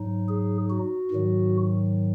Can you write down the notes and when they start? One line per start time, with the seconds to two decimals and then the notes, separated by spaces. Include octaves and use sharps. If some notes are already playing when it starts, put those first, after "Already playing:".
Already playing: G#2 F#3 D#4
0.29 G#4
0.70 F#4
1.11 G#2 D#3 F#3